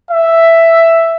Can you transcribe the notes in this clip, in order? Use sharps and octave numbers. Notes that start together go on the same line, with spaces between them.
E5